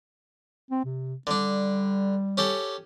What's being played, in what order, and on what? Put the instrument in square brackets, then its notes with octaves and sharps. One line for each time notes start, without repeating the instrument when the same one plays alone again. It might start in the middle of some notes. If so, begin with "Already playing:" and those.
[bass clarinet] C4
C3
[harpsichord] D3 D4 [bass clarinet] G3
[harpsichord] C#4 G4 A4